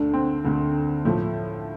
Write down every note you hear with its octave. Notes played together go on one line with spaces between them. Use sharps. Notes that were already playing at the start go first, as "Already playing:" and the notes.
Already playing: D2 D3 A3 D4
C4
D2 D3 A3
A2 F3 A3